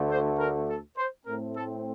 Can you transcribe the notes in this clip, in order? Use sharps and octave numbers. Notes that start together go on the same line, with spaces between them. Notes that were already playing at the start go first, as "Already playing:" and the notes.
Already playing: D2 D3 A3
C5
A#4
A4
C5
A2 A3 C4 A#4
A4